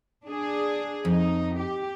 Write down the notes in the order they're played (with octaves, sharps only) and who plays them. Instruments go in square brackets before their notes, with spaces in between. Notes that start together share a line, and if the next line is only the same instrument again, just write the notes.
[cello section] D4 G#4
[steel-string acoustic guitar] F2 [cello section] D#4
[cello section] G4